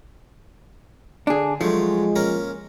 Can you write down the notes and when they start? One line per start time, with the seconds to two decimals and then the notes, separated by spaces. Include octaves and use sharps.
1.27 D3 D4 G#4
1.61 F3 F#3 G#3 A3
2.16 A#3 C#4 A#4